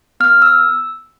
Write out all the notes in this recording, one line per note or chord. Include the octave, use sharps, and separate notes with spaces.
B3 F6
E6